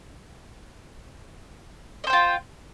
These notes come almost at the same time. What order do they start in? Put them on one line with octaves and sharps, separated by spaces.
D#5 C5 G5 F4